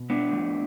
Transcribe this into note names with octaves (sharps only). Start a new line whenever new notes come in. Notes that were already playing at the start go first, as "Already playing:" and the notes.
Already playing: B2
B3 D4
F2 D3 A3